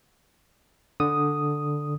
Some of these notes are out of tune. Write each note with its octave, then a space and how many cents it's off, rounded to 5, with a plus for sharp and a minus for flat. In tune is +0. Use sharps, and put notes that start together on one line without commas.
D3 +0 D#6 +0